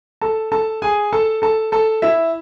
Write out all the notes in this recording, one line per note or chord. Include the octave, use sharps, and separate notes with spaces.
A4 A5
A4 A5
G#4 G#5
A4 A5
A4 A5
A4 A5
E4 E5